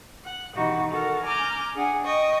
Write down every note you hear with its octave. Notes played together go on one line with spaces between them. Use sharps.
F#5
B2 D#3 E3 D#4 F#4 G4
F#4 A4 A#4
G#5 A#5 D6 F6 G6
D4 G#4 F#5 G#5
D#5 G5 C#6 D#6